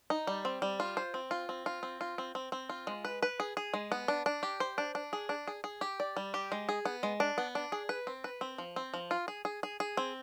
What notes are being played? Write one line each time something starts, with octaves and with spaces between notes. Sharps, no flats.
D#4
G3
C4
G3
F4
C5
C4
F4
C4
F4
C4
F4
C4
C4
C4
F4
G#3
B4
B4
G#4
G#4
G#3
B3
D4
D4
G4
C5
D4
D4
G#4
D4
G#4
G#4
G4
D5
G3
G4
G#3
G#4
B3
G#3
D4
B3
D4
G#4
B4
C4
B4
C4
F3
C4
F3
F4
G#4
G#4
G#4
G#4
C4